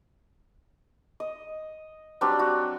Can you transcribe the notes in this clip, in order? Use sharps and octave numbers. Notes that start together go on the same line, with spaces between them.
D#5
F#3 G3 C4 D4
F#4